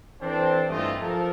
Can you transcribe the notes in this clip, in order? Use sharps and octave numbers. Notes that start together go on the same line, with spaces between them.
E3 C4 D4 A4 C5
G2 E3 A3 C4 F4 D#5
F3 A4 A#4